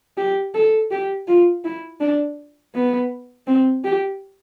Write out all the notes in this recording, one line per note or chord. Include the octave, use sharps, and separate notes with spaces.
G4
A4
G4
F4
E4
D4
B3
C4
G4